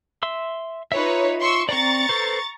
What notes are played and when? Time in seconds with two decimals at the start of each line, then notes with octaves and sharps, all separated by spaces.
0.23 E5 C6 E6
0.92 D#4 F4 B4 C#5 E5
1.39 C6 C#6 E6
1.69 C4 D5 A#5 C#6 A6
2.09 A4 B4 C5